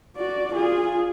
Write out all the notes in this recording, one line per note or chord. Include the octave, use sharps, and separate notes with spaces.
F#4 D5
F4 G#4